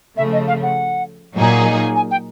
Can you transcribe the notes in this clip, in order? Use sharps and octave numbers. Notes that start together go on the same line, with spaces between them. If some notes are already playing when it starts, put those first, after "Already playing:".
C#3 F3 A3 E5
D#5
F5
F#5
A#2 F#3 A#3 D#4 G#4
G#5
G5